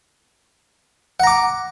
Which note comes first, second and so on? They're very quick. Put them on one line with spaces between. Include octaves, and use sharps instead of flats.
F#5 A#5 D6